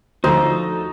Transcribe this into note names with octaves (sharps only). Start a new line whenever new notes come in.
D2 D3 F3 D#4 F#4 A4 C5